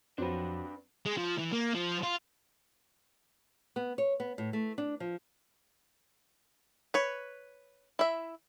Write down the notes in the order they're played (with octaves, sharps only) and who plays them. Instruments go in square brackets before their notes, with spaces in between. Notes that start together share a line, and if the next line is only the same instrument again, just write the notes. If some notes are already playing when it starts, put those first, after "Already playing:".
[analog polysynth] F2 [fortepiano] F#3 C4 [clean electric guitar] D4 B4
[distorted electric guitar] G#3
F3
E3
A#3
F3
F4
[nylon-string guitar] B3
C#5
B3
A2
A3
D4
F3
[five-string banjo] B4 C#5
E4 E5